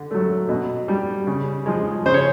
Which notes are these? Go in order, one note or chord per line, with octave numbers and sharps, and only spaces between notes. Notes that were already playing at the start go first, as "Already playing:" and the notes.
Already playing: D3
F#3 A3
B2
G3
C#3
F3 G#3
C#3 C5
C#5